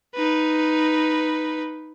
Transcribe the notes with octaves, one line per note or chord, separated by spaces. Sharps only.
D#4 B4